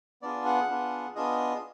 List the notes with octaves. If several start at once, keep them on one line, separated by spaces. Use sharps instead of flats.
B3 D4 F4 G#4 D5
F#5
B3 D4 F4 G#4
B3 D4 F4 G#4 D#5